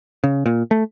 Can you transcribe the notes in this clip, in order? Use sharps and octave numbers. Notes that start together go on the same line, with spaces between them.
C#3
A#2
A3